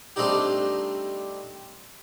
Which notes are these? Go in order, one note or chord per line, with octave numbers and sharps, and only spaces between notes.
G3 A3 C4 D4 D#4 G4